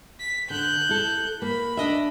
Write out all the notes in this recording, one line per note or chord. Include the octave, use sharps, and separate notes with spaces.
B6
D3 F#6 G6
E4 A4
A#3 B5
D4 D#5 E5